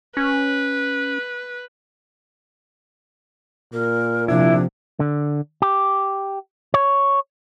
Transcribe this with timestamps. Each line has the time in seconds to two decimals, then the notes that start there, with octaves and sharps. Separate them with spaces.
0.17 C#4 B4
3.73 A#2 A#4
4.28 C3 F3 D4 E4
5.00 D3
5.62 G4
6.74 C#5